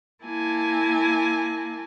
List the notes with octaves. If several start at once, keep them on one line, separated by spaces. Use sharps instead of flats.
A#3 E4 G#5 A5